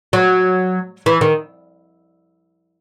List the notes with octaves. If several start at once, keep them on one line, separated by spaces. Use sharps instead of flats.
F#3
E3
D#3